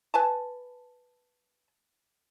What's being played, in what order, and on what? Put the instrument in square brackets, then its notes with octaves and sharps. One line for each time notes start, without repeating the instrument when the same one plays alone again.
[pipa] B4 G#5 A5